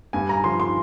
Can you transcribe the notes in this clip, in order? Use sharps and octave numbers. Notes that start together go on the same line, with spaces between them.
G2 G#5
A#5
F3 C6
C6